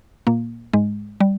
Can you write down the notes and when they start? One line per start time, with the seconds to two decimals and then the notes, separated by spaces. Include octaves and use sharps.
0.27 A#2 A#3
0.73 G#2 G#3
1.20 G3